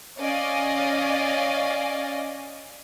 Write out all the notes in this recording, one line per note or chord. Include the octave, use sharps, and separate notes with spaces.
C#4 D5 D#5 F5 G#5